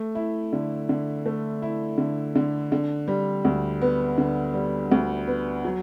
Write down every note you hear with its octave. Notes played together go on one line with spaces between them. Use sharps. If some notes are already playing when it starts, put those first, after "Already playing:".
Already playing: A3
E4
D3
D3
A3
E4
D3
D3
D3
G3
D2
B3
D3
G3
D2
B3
F#3